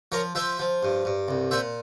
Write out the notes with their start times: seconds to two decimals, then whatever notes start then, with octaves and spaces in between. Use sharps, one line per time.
0.12 F3 A#4 C#5
0.35 F3 C5 E5
0.59 F3
0.83 G2
1.05 G2
1.28 C2
1.51 A#2 C5 E5